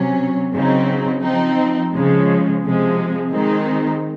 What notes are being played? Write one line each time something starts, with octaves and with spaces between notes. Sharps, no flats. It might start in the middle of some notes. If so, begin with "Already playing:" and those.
Already playing: C3 F#3 C#4
C#3 F#3 C4 D#4
F3 C4 D#4
C#3 F3 G#3
C3 F3 G#3
D#3 G#3 C4 D#4